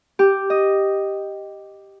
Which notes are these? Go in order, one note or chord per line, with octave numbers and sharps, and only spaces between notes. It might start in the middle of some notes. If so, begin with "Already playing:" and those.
G4
D#5